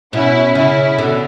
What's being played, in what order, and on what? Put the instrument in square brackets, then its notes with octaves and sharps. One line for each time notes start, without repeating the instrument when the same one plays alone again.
[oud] B2 [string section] C#4 E4
[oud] C#3 [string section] C#4 E4
[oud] B2 D3